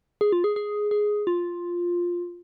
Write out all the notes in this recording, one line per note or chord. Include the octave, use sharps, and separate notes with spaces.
G#4
F4
G#4
G#4
G#4
F4